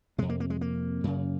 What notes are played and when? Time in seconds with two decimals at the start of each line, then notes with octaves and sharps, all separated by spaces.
0.18 F2 C3 G#3
0.29 A#3
0.40 A#3
0.50 G#3
0.61 A#3
1.04 F#2 C#3